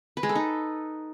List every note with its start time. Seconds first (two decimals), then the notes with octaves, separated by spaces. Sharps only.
0.17 B4
0.23 G#3
0.29 A4
0.35 D#4